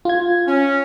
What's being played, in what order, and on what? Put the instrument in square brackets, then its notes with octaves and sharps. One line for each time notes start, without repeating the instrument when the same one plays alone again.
[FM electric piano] F4 G#6
[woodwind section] C#4